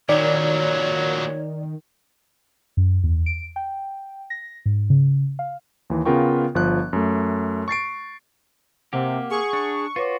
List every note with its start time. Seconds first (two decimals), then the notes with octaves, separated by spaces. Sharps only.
0.09 A#2 D#3 F#3 C#5 D5
2.77 F#2
3.04 E2
3.26 D7
3.56 G5
4.30 A#6
4.66 G#2
4.90 C#3
5.39 F5
5.90 D#2 E3
6.05 C#3 B3 F4 A#4 G5 C#6
6.55 G1 F3 F#6
6.93 F#2 A3
7.68 C#6 A6 C7 D7
8.93 C3 A#3 G4 F#5
9.30 G#4 C#6
9.53 D4
9.96 F4 F#4 B4 C#5 D6